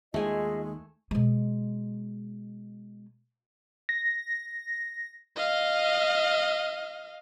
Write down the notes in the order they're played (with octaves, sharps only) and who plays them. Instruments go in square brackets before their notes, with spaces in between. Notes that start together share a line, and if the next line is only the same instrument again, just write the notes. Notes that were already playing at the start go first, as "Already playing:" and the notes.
[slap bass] D#2 D#3 [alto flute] G#3 [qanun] A3 G#5 [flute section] F4 G#4 D#5
[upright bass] B2 G#3
[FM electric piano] A#6
[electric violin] D#5 F5